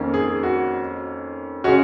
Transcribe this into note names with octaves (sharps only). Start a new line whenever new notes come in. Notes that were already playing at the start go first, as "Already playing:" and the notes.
Already playing: F2 D#3 A#3 C#4
G#4
F#4
C#3 G#3 C#4 F#4